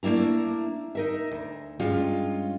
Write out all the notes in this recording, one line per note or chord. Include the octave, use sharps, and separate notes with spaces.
A3 A#3 D4 E4 A#5
D#4 A#4 E5
D2
G2 G#3 C#4 F4